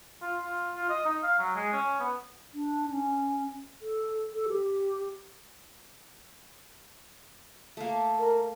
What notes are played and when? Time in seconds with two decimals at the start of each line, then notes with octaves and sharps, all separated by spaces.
0.22 F4
0.42 F4
0.76 F4
0.90 D#5
1.05 D#4
1.23 F5
1.39 F#3
1.56 G#3
1.73 C#4
2.00 B3
2.53 D4
2.90 C#4
3.82 A4
4.34 A4
4.49 G4
7.77 A3 A#3
8.19 A#4